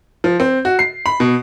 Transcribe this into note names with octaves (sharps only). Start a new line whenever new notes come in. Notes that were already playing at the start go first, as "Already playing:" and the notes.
F3
C4
F#4
C7
B5
B2